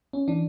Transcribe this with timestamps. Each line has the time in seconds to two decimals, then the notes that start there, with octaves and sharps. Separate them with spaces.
0.13 C#4
0.28 E3 D4